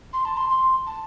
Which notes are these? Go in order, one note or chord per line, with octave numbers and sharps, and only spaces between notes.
C6
A5
C6
C6
A5